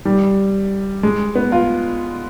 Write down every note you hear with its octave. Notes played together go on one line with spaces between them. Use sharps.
G3
G#3
B3
F4